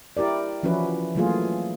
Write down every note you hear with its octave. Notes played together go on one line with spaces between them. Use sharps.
E4 G4 A#4 D5
E3 F3 C#4 E4 F#4 B4
E3 F#3 A3 A#3 F4 G#4